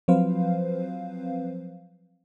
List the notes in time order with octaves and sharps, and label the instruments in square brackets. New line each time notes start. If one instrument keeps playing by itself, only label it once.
[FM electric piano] F3 F#3 C4 B4 C5 F5